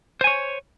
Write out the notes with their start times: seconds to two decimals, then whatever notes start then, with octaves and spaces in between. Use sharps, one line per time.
0.21 C5
0.24 G#5
0.27 C#5